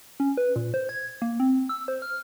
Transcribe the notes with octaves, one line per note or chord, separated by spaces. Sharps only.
C#4
B4
A#2
C5
G#6
A#3
C4
E6
C5
F6